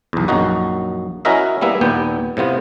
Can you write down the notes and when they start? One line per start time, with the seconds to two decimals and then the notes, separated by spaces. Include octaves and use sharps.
0.13 B1 E2
0.28 A#1 F#2 D#4 F#4
1.25 C#4 E4 F#4 A#4 D#5 E5
1.61 G3 A#3 B3 E4 E5
1.81 D#2 A#2 B3 G5
2.37 A2 C3 B3 F4